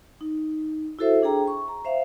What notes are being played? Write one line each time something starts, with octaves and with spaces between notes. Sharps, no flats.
D#4
E4 F#4 A4 C5 E5
D4 G#4 G5 A#5
C#6
A#5
C5 E5 F5